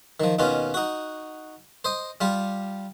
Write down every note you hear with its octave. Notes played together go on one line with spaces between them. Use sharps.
D#3 F3
D#2 B2 C#4 F4
D#4 F#4
C5 D#5
G3 F4 G4